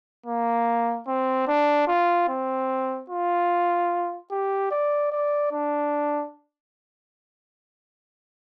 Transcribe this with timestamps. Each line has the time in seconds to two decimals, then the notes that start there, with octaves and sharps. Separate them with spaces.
0.26 A#3
1.07 C4
1.47 D4
1.88 F4
2.29 C4
3.10 F4
4.31 G4
4.71 D5
5.12 D5
5.52 D4